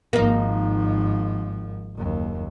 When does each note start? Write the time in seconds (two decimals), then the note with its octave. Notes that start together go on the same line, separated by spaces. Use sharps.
0.13 G#1 F3 A#3 D#4
1.95 F#1 D#2